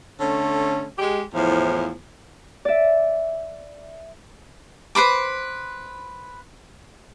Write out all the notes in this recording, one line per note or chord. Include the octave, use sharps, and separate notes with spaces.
D3 A3 C#4
G#3 G4
E2 A2 F3
D5 E5
B4 C5 B5 D6